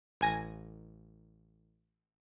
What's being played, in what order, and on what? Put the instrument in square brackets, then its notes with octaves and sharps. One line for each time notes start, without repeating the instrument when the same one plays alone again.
[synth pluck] A1 G#5 A#6